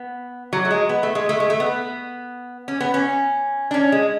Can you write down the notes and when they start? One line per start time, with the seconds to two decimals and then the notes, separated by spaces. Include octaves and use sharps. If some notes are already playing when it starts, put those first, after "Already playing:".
Already playing: B3
0.53 F#3
0.65 A3
0.71 G#3
0.89 B3
1.03 A3
1.15 G#3
1.29 A3
1.40 G#3
1.50 A3
1.60 B3
2.68 C#4
2.81 B3
2.94 C#4
3.71 D4
3.74 C#4
3.92 G#3